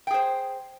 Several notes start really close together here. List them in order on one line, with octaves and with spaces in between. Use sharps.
G5 G#4 C5